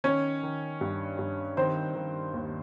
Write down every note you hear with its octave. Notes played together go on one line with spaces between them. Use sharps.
D#3 C#4 C#5
D#3
G2
G2
D#3 C4 C5
D#3
D#2